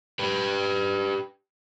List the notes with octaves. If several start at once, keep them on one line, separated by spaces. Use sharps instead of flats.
G4 B4